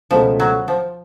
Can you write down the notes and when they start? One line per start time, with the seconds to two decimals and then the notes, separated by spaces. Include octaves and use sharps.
0.11 C#2 B2 F3 A3
0.40 F#3
0.68 F3